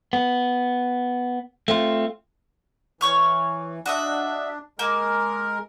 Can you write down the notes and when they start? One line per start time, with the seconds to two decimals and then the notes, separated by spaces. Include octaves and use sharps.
0.13 B3
1.68 A3 C4 F4
3.01 E3 C#5 C#6 F6
3.86 D4 F#4 D#5 E5
4.79 G#3 A#3 A#4